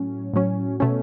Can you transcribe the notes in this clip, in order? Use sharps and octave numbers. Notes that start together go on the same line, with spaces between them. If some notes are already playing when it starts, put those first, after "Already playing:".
Already playing: A2 F#3 C#4
A2 F#3 C#4
B2 A3 C#4